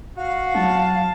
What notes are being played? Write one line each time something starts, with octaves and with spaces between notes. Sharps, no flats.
F#4 F5
F#3 A5